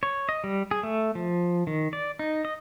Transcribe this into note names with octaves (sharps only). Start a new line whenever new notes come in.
C#5
D#5
G3
G#4
A3
F3
D#3
D5
D#4
D#5